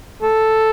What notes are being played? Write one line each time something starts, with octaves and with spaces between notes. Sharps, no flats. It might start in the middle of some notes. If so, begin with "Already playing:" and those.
A4